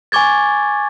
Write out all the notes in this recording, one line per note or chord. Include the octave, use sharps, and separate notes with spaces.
G#5 C#6 D6 G#6 A6